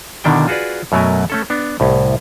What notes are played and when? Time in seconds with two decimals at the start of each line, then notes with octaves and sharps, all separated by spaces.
0.24 B2 D3 D#3 D4 E4 G5
0.48 F4 F#4 G#4 B4 D5
0.92 F#2 B2 F#3 A3 A#4 G#5
1.30 A3 C#4 A4
1.50 B3 D4
1.80 C2 A2